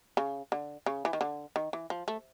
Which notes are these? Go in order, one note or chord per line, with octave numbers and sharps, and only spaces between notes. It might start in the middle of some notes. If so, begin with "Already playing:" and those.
C#3
D3
C#3
E3
D#3
D3
D#3
E3
F3
A3